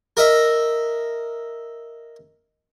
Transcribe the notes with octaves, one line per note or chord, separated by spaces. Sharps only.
A#4 D#5 E5